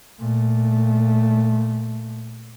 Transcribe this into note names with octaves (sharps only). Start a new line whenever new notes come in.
A#2 A3